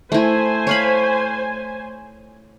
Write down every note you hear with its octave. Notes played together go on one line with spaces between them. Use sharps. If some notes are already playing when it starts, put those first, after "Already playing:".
A3 E4 C5 G#5
C#5 F5 B5